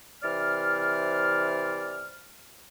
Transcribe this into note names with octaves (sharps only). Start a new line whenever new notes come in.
C3 E3 C5 D5 F6